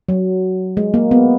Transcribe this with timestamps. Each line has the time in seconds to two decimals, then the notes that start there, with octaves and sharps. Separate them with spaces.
0.09 F#3
0.77 G#3
0.94 A#3
1.11 B3